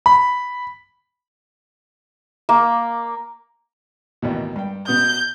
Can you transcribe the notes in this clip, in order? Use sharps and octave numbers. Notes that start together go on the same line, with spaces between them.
B5
A#3
A1 D#2 B2
G2 G5
B2 B3 D#6 G6